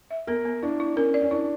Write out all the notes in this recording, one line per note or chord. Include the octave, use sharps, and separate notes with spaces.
E5
B3 A#4
B3
D4 E4
E4
C#4 A#4
D5
C#4
D4 E4